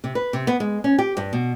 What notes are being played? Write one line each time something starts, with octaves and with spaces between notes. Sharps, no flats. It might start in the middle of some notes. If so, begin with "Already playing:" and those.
C3
B4
C3
B3
G#3
C#4
G4
G2
B2